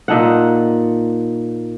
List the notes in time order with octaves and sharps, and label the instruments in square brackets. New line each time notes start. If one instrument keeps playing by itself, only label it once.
[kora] A#2 D#4 A4 F#5